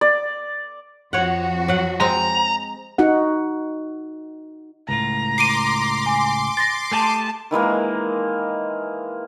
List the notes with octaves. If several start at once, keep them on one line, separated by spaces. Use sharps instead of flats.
D5
F2 F3 F#4 C#5 F#5
F#3 F#5
G#3 C4 A#5
D#4 F#4 F#5
C#2 A2 F4 A#5
C6 D6 C7 D7 D#7
G#5
A6 A#6
A3 G4 G#4 A5
D#3 E3 G#3 A#3